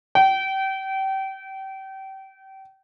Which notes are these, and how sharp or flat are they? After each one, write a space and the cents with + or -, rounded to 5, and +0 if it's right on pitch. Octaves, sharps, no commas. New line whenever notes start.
G5 -30